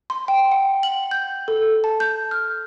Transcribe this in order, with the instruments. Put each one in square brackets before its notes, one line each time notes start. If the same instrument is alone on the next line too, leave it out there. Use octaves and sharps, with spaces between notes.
[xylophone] C6
G5
F#5
F#7
G6
A4
A5
G6
F6